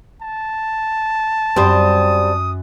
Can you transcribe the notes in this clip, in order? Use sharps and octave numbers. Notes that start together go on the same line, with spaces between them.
A5
F#2 G3 C4 C6 D#6 D#7